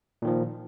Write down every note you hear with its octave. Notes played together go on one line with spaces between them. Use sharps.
A#2 D#3 F3